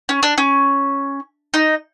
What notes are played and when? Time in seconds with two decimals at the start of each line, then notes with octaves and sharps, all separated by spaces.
0.09 C#4
0.23 D4
0.38 C#4
1.54 D#4